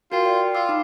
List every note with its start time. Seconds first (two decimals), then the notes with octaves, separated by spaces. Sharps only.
0.12 F4 F#4 A#4 G5
0.25 D5 G5
0.55 F4 D6 E6
0.69 D#4 F5 B5